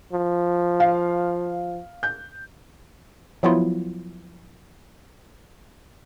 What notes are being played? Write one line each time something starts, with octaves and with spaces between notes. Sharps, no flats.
F3
F5
G6
F3 F#3 B3 E4 F4